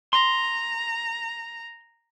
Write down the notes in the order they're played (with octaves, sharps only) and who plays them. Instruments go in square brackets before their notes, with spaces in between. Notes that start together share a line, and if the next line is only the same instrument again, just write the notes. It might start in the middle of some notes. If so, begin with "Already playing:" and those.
[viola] A#5 [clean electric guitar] C6